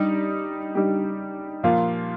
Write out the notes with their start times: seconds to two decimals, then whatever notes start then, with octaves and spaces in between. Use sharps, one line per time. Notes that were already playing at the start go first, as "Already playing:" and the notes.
Already playing: G3 D#4 G4
0.75 G3 D#4 G4
1.63 A#2 F3 A#3 F4